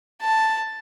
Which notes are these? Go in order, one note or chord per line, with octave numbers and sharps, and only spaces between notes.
A5